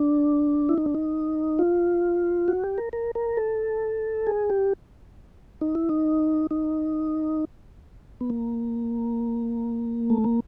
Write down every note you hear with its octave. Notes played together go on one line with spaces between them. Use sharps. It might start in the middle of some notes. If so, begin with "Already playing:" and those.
Already playing: D4
E4
D#4
D4
D#4
F4
F#4
G4
A#4
A#4
A#4
A4
G#4
G4
D#4
E4
D#4
D#4
B3
A#3
A3
A#3